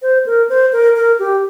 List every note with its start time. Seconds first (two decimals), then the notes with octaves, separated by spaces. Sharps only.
0.02 C5
0.26 A#4
0.49 C5
0.72 A#4
0.96 A#4
1.19 G4